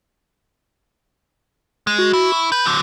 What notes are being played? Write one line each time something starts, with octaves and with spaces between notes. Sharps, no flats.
G#3
F#4
E4
C#6
B4 G6
D3 F#3